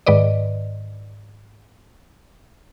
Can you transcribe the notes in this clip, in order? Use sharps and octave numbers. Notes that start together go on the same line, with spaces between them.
G#2 D#3 B4 D5 D#5